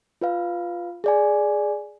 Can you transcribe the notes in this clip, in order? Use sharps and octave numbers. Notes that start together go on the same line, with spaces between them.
F4 B4 F5
G#4 D5 G#5